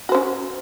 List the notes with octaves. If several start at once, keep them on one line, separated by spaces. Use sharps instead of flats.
C#4 F#4 C5